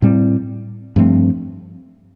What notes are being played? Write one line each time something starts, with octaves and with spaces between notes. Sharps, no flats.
A2 G3 C4
G2 F3 A3 C4